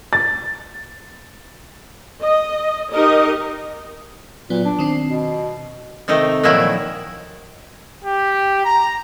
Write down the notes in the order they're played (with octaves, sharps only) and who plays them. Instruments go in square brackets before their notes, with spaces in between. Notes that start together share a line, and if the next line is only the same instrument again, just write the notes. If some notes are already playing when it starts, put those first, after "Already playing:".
[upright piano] A6
[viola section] D#5
D#4 G4 A#4 D#5
[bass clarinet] A#2 [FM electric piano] F#3 B3
[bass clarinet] D4
[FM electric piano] D#3 C4 C7
[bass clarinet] B2
[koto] C3 D#3 A3 D#4
A#2 D#3 F3 F#3 E4
[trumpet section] G4
A#5